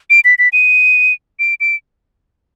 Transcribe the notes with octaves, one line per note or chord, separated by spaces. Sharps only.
D7
B6
B6
D#7
D7
D7